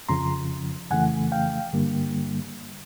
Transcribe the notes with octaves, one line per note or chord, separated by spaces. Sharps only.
F2 C#3 F3 A#5 C6
F2 C#3 E3 A3 F#5 G#5
F5 G5
G2 D3 G3 A#3